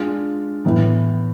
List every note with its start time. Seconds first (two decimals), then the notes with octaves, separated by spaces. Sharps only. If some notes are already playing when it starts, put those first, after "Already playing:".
Already playing: G#3 D4 F4
0.65 A2 E3 B3